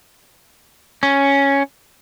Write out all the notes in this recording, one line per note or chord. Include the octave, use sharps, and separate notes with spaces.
C#4